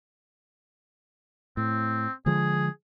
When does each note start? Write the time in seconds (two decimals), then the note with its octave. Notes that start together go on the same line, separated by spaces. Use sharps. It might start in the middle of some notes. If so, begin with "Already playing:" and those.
1.57 A2 C4
2.26 D3 F3 G#3 G#4